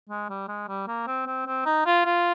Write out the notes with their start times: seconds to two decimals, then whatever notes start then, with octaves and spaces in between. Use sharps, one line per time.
0.09 G#3
0.29 G3
0.48 G#3
0.68 G3
0.87 A#3
1.07 C4
1.26 C4
1.46 C4
1.65 D#4
1.86 F4
2.05 F4